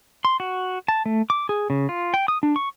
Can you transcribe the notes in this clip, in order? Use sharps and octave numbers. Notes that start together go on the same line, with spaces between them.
C6
F#4
A5
A3
D6
G#4
C#3
F4
G5
D#6
D4
C#6